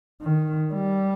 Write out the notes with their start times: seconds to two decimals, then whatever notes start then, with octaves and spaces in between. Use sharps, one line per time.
0.22 D#3
0.74 G3